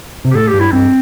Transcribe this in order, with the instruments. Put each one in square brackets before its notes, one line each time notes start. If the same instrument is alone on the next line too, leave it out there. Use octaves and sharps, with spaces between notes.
[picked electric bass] C3
[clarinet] G4
[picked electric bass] A2 [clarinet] A4
[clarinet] G4
[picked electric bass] G2
[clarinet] E4
[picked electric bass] G2 [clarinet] C4